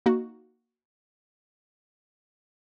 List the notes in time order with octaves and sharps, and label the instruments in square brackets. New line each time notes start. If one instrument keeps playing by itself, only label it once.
[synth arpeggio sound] A#3 D#4 F#4